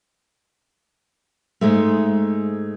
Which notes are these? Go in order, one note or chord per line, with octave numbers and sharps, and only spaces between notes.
G#2 G#3 A3